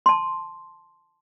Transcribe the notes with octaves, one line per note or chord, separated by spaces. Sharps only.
A5 C6